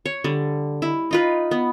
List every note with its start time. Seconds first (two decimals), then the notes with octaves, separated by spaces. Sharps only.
0.06 C#5
0.24 D3 G3
0.82 E4
1.11 D#4 F4 B4
1.51 B3